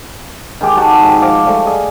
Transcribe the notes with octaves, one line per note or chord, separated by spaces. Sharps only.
D#3 G#3 G4
D#4 F#4 G4 A5
G#2 D#3 G#3
F3 F5 D6
G3 A3
G#4 D#5